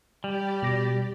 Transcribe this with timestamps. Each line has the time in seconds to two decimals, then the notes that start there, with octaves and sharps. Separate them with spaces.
0.24 G3 G4 D5
0.63 B2 A#6